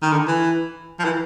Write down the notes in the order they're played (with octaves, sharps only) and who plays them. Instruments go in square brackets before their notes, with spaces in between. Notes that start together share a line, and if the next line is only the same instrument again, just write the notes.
[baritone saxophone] D#3
D3
E3
F3
E3